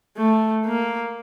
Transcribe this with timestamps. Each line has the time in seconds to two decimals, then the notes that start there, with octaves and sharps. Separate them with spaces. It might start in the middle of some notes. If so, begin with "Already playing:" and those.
0.17 A3
0.65 A#3